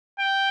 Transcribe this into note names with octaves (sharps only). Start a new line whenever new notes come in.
G5